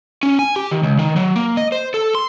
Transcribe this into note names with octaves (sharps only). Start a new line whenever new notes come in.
C#4
G#5
G4
D#3
C#2
D#3
F#3
A#3
D#5
C5
A4
C6